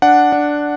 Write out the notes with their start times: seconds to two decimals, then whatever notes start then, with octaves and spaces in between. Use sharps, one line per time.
0.02 D4 F#5
0.32 D4